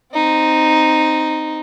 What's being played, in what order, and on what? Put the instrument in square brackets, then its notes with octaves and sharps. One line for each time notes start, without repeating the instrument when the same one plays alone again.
[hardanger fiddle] C4 D#4